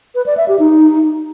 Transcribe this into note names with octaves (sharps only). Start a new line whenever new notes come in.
B4
D5
E5
G4
D#4